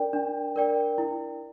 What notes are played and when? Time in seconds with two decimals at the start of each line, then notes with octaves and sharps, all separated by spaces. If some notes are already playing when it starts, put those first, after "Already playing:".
Already playing: D4 A#4 D5 G5
0.13 D4
0.56 A#4 D5 G5
0.98 E4